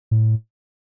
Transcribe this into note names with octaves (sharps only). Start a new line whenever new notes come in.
A2